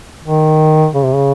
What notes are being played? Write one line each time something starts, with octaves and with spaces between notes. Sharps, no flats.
D#3
C#3
C3
C#3